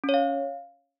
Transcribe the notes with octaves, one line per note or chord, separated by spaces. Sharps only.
C#4
C#5
F5